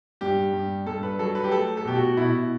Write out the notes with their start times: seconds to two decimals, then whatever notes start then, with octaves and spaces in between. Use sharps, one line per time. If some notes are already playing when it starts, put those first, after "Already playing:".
0.21 G2 G4
0.53 G2
0.86 G2 A4
1.03 B4
1.19 F#3 A4
1.35 B4
1.44 G4
1.52 A3 A4
1.77 A4
1.85 B2 G4
1.96 F#4
2.17 B2 E4